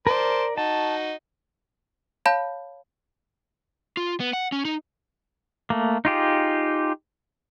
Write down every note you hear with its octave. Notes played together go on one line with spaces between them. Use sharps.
A#4 C5 D5 A5
D#4 F#4 A5
C#5 F5 A5 B5 G6
F4
B3
F#5
C#4
D#4
A3 A#3
D#4 F4 G4 G#4